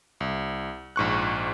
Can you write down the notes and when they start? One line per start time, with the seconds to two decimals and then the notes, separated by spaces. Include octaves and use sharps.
0.20 C2
0.96 A#1 G#2 C#6 F#6